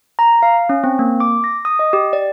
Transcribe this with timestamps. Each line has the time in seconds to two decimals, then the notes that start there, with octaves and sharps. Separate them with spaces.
0.19 A#5
0.43 F5
0.69 C#4
0.84 C4
0.99 A#3
1.20 D6
1.44 A#6
1.65 D#6
1.79 D#5
1.93 G4
2.13 D5